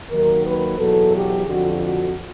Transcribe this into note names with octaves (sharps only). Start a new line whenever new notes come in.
D#2 D#3 F#3 A#4
B4
E2 B2 F#3 A4
G4
F2 D3 F3 F#4
F#4